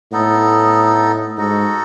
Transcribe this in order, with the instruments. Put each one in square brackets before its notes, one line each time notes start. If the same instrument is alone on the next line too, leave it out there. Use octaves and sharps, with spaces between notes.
[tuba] A2 [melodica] B3 D#4 A4
[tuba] G#2 [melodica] D#4 F#4 A4